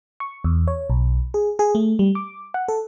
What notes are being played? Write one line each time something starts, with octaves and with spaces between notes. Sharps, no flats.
C#6
E2
C#5
B1
G#4
G#4
A3
G3
D6
F#5
A4